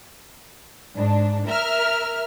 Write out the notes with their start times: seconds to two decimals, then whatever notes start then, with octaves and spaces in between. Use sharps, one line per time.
0.95 G#2 D4
1.47 A#4 E5 F6